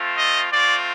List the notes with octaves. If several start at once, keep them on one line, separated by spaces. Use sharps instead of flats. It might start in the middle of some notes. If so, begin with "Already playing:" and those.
Already playing: A3 C4 F4
D#5
A3 C4 F4 D5